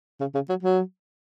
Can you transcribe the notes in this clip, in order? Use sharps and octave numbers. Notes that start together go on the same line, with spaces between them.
C#3
C#3
F#3
F#3